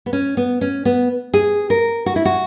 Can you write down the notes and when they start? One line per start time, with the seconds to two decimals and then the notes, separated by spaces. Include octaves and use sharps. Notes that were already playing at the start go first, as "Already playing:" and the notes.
0.06 B3
0.13 C#4
0.37 B3
0.61 C#4
0.85 B3
1.34 G#4
1.70 A#4
2.06 F#4
2.16 E4
2.25 F#4